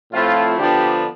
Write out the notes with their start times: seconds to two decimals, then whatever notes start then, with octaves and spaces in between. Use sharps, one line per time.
0.12 A2 F3 A3 C4 E4 F4
0.59 D3 F3 B3 D4 G4